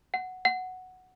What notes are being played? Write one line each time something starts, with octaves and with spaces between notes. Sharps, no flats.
F#5
F#5